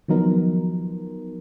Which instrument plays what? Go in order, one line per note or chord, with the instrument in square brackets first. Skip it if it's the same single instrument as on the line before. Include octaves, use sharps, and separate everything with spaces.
[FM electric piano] D#3 F#3 B3 D#4 A#4 [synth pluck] F3